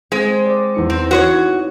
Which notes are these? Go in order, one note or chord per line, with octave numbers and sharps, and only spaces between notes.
G#3 C4
D5 D6
E2 D#4 C#7
C4 A#6
F#4 C5 C#5 D#6